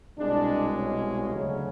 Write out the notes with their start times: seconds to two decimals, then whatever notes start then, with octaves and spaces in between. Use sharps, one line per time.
0.18 C2 B2 G#3 D4
0.77 C#4
1.35 D2 C#3 F#3